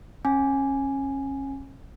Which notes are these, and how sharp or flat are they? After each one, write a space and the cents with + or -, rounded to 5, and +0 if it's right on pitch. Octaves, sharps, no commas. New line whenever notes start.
C#4 -30 G#5 +0